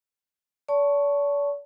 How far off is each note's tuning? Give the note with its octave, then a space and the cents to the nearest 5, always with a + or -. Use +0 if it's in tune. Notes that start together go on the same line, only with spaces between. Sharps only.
D5 -45 A5 +0 C#6 +0